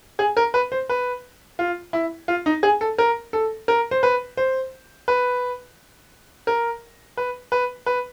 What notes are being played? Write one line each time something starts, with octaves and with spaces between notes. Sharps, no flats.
G#4
A#4
B4
C5
B4
F4
E4
F4
D#4
G#4
A4
A#4
A4
A#4
C5
B4
C5
B4
A#4
B4
B4
B4